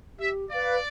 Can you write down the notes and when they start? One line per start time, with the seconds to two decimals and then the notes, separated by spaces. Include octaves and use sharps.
0.19 G4 E5
0.51 B4 D5 F5